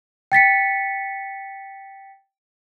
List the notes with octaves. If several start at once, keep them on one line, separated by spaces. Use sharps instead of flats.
G5 A6 B6 C#7